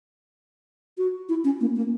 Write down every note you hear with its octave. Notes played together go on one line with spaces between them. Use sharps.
F#4
E4
C#4
A#3
A#3